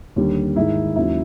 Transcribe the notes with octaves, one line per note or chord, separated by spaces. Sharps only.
D#2 D3 G3
G#2 D#3 G#3 E4
D#2 C#3 F#3 E4